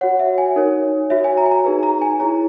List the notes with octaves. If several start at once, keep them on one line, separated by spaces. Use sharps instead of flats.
F#4 C#5 F#5
E5
G#5
D#4 A#4 C#5
F#4 C#5 E5
G#5
A#5
G#5
A#5
D#4 G#4 B4
A#5
G#5
E4 G#4 C#5 A#5